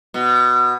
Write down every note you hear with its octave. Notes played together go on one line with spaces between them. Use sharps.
B2